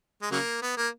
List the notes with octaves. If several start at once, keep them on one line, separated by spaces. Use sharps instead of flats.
G#3
C#3 F#3 A#3
B3
A#3